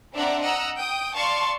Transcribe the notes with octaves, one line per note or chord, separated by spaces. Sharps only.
C4 D4 D5 E5 F#5 A#5
D#5 F#5 A#5 E6
G5 D#6
D5 F5 A5 C6 C#6